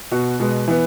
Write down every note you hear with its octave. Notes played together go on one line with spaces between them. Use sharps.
B2 B3 F#4
B2 G#3 B3
E3 B3